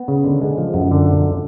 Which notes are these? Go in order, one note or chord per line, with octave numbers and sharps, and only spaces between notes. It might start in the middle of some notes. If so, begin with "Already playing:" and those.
Already playing: B3
C#3
D3
G#3
F3
F#2
D3